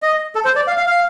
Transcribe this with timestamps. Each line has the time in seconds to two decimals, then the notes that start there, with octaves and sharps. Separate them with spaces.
0.02 D#5
0.35 A4
0.45 C5
0.56 D5
0.67 F5
0.77 F5
0.87 F5